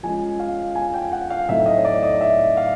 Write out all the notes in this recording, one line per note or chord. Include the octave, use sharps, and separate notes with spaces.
F3 G#3 C#4 G#5
F5
G#5
G5
F#5
F5
A2 F#3 A3 C4 D#4 E5
D#5
C#5
D5
D#5
E5
F5